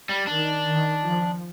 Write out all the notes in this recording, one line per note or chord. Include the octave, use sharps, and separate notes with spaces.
G3
D#3 D4
D#3
F3